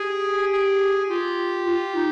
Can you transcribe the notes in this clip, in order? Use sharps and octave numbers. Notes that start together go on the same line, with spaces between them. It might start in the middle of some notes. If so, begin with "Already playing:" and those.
Already playing: G4 G#4
G#4
F4 G4
F4
D#4